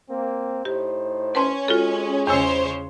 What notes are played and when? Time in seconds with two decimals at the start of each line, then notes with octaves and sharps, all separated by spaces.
0.10 A#3 C4
0.65 A2 D#4 G4 C5
1.35 C#4 B4 A5 C6
1.68 G#3 F4 F#4 A4
2.27 E2 C#3 C5 C#5 G#5 E6